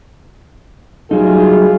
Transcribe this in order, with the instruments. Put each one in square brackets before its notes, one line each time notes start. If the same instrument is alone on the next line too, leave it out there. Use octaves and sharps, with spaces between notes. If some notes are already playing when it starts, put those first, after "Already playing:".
[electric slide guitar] F#3 G3 D#4 [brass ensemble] A3 F4 G#4